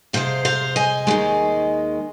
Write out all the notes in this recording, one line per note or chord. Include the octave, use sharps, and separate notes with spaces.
F2 C3 G#3 C5 F5
C5 F5
D#5 G#5
D#2 D#3 G#3